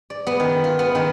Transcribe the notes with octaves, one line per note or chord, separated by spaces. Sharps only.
D5
B3
D#3
F4
B3
D#3